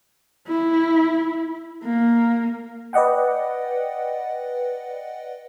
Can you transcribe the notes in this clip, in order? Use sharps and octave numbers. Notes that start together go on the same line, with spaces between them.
E4
A#3
B4 D5 D#5 F#5 G5